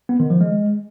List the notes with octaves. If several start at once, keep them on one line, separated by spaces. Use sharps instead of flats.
B3
D#3
F3
G#3